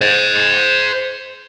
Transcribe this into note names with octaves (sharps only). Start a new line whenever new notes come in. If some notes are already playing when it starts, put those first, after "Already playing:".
C5 D#5